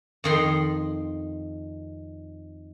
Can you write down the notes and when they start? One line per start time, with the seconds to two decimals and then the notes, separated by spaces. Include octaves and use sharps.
0.24 F2 D#3 C6